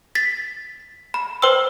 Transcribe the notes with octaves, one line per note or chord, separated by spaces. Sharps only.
A6 B6
B5
B4 C5 G5 C6 E6